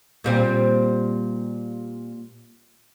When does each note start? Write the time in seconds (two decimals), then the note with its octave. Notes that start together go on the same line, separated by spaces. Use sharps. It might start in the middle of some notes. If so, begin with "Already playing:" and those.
0.24 A#2 G3 C4